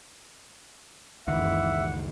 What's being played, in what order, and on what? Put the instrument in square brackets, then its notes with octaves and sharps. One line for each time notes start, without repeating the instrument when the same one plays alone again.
[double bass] F#1 E3 [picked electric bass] C#2 D#3 [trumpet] E5 [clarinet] F#5